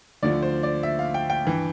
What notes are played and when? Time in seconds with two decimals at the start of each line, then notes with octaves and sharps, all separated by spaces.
0.23 D2 D3 F3 D5
0.43 C5
0.63 D5
0.83 E5
0.99 F5
1.14 G5
1.30 G5
1.45 G2 E3